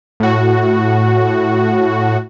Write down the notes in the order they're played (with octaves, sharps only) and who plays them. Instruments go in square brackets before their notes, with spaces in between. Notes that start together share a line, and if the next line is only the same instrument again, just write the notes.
[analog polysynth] A2 F#4